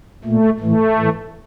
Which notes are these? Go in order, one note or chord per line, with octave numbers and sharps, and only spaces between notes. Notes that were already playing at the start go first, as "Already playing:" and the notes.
A#2 A3
A2 E3 A3
A2 E3